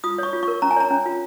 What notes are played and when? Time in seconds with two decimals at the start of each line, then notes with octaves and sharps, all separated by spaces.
0.04 F4 D#6
0.18 C#5 C#6
0.33 F4
0.43 A#4 C#6
0.62 C#4 A#5
0.71 G#5
0.76 C#5 A#5
0.91 C#4
1.06 F4